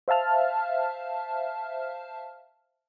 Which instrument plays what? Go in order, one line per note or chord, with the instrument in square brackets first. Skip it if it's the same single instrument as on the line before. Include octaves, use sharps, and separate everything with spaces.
[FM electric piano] C5 E5 F5 A5 F6